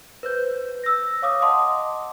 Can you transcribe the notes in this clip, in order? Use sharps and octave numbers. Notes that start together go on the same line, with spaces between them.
B4 C5 G6
E6 A#6
C#5 F5 D6 D#6
D#5 F#5 A5 C6 D6 D#6